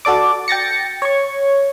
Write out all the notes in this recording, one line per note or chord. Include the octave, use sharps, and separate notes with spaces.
F#4 A4 D5 D6
G5 A6 A#6 C#7
C#5 C#6